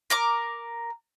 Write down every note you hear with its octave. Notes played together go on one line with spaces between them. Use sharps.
A#4 A#5 D6